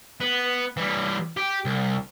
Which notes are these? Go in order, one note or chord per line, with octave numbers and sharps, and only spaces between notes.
B3
E3 G3
G4
C2